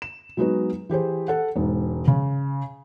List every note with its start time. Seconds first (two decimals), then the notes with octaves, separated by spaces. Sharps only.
0.02 E7
0.37 F#3 G#3 B3 D#4 F#4 B4
0.89 E3 G4 G#4 C5
1.28 A4 F#5
1.56 E1 G#2
2.08 C#3